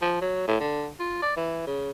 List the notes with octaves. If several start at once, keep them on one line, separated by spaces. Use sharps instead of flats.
F3
F#3
A2
D3
F4
D5
E3
C#3